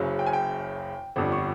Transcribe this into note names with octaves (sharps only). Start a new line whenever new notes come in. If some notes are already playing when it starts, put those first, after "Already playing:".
Already playing: F#1 F#2 C#3 F#3
G5
G#5
G5
G1 F2 D3 G3
C#6